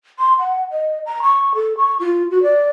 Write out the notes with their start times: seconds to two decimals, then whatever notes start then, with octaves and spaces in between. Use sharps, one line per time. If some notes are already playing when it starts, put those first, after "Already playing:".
0.19 C6
0.38 F#5
0.71 D#5
1.06 A#5
1.22 C#6
1.55 A4
1.77 C#6
2.00 F4
2.31 F#4
2.43 D5